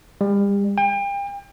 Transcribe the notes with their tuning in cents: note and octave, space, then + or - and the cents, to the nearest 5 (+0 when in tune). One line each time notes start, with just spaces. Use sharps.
G3 +35
G5 +35